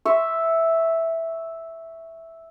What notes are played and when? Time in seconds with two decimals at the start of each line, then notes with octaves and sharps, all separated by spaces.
0.05 E5 C#6